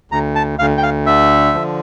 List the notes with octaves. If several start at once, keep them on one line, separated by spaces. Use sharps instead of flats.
D2 A#5
A5
D2 F5
G5
F5
D3 E5
F3